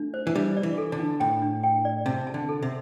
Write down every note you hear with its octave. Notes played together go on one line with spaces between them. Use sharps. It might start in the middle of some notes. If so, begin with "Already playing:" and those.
Already playing: A3 D4
C5
E3
G3 D4
D5
E3
A4
D3
D4
A2 G5
D4
G5
D5
C3 A5
A5
D3
A4
C3